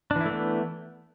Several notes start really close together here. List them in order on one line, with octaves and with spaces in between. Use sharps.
D4 E3 E4 A3 B3